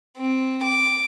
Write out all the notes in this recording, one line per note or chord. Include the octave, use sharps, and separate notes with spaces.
C4
D6